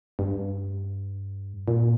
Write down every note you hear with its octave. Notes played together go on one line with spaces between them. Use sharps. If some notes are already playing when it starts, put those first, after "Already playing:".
G2
A#2